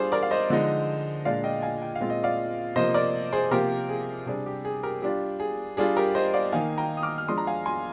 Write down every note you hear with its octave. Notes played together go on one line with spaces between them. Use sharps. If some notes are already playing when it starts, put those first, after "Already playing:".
Already playing: G3 D4 F4 G#4 C5 F5
A#4 D5
F5
C5 D#5
D3 F3 G#3 D#4
A#2 G#3 D4 F4 D5 F5
D#5 G5
F5 G#5
G5
F5
A#2 G#3 C4 F4
D#5
D5 F5
C3 F3 A#3 C5 D#5
A#4 D5
G#4 C5
C3 F3 A#3 F4 G4 A#4
G#4
C3 G3 D4 G#4
G4
G#4
G4 A#4
G3 D4 F4 G4
G#4
G3 D4 F4 G#4
G4 A#4
C5 D#5
D5 F5
D#3 A#3 D#4 F5 G#5
G5 A#5
D#6
D6 F6
F6
F3 G#3 D4 C6 D#6
A#5
F5 G#5
G#5 C6